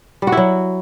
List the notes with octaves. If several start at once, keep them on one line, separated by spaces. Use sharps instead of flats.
G3
F#4
E4
F#3